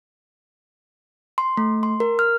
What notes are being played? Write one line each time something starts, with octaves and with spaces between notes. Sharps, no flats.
C6
A3
C6
A#4
F6